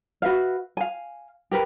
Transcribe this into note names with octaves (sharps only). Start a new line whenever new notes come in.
F#4 B4 E5 F5
F5 G#5
G4 A#4 B4